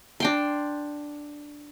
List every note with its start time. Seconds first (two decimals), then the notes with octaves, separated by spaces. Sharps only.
0.20 D4 G5 C6